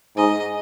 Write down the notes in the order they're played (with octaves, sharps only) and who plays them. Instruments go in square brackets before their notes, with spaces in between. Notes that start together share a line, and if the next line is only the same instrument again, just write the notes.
[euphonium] G#2 [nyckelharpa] D#5